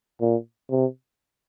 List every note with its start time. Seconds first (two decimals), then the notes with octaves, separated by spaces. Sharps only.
0.21 A#2
0.71 C3